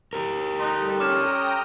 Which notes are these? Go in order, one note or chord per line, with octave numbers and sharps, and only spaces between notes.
G4 A#4
G3 D#4 A4 C6 F#6
C#4 G5 A#5 D6 D#6 F6 E7